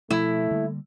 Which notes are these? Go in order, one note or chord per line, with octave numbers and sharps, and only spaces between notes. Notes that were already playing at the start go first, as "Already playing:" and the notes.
B2 F3 A3 E4
D3 G3 A#3